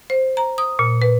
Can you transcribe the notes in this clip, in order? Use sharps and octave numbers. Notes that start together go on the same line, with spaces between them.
C5
A#5
D#6
A#2
B4